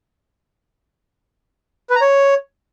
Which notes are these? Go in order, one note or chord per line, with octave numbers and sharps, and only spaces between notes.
B4
A#5
C#5